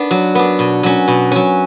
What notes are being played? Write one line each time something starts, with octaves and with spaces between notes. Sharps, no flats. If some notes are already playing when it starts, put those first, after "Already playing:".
Already playing: B3 D4
F#3
B3 D4
B2
F#3 C#4
B2
F#3 C#4